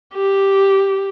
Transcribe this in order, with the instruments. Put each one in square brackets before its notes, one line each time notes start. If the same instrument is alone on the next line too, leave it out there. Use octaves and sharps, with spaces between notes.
[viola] G4